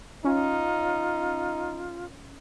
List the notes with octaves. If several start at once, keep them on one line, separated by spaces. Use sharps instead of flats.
C#4 D#4 F4